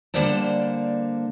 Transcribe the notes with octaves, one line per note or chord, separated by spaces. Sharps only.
D3 G3 A#3 C5 D5 A5